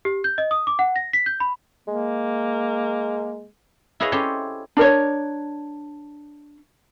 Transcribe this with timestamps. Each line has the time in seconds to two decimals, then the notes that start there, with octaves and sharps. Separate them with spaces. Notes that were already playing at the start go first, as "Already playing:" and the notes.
0.05 G4
0.24 G6
0.38 D#5
0.51 D#6
0.67 D6
0.79 F#5
0.96 A#6
1.13 B6
1.26 G6
1.40 B5
1.88 G#3 A#3
4.00 E4 G#4 B4 C#5 D#5 F5
4.12 C#4 G4 A4 C5 C#5
4.77 D4 A#4 C#5